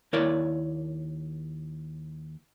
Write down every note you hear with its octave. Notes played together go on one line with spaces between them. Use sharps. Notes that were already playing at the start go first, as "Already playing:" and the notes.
D#2 E4 A#4 C#5 D5